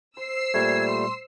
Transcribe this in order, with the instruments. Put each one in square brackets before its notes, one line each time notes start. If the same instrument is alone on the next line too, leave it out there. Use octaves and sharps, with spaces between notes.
[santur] C5 [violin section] E6 C7
[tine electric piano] A#2 G3 A3 [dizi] G#6
[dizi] C6